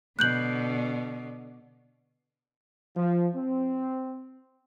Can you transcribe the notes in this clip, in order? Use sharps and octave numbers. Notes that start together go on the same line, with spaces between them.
B2 D3 F#6 G6 F#7
F3
C4